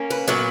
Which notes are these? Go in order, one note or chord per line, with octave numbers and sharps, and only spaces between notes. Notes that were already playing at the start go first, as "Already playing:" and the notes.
Already playing: A#3 C#4
B4
A#2 F#3 B3